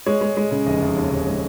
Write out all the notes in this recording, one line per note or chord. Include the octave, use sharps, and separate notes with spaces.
G#3 C#5
G#3
G#3
C#3
F1 D#5
F1
D#2
F1
G#3